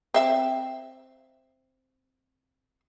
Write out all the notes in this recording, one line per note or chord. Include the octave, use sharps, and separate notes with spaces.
C4 E5 F5